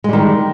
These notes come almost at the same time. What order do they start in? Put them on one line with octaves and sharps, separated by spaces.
G#3 G3 D#3